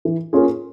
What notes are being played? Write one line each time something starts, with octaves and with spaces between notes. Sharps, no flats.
E3
A#3 C#4 F4 G#4